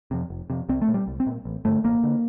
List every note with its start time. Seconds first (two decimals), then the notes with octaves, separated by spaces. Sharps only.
0.11 F2 C3
0.30 F1
0.50 F2 C3
0.69 C2 C4
0.82 A3
0.88 A#2
0.94 G3
1.08 C2
1.20 C4
1.27 A#2
1.45 A1
1.65 G2 D3 A3
1.84 A1 A#3
2.03 D3